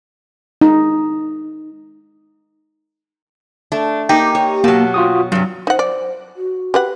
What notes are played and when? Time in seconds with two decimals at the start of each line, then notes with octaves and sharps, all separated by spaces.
0.61 D#4
3.72 A3 D4
4.09 A#3 D#4 G4
4.35 C#5
4.64 B2 F#3 A#3 F5 A5
4.94 F4 F#4 D#6
5.32 G2 C3 F#3
5.67 D#4 C5 F#5
5.79 D5
6.36 F#4
6.74 G4 B4 F#5